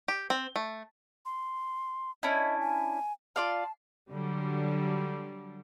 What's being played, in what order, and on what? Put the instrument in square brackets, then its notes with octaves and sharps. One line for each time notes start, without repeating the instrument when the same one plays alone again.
[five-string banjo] G4
C4
A3
[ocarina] C6
[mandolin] C#4 D4 E4 [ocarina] D#5
[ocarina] G#5
[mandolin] F4 D5 F5 [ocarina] A5
[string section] D3 F#3 G3